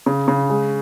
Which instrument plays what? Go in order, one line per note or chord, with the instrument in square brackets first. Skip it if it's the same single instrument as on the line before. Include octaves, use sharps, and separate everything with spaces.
[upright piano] C#3
C#3
G#3